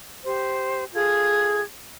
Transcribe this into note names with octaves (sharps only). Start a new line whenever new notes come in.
G4 C5
F4 G#4 A4 G#6